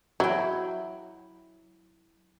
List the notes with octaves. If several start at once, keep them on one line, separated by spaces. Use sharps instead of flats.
F#3 E4 G5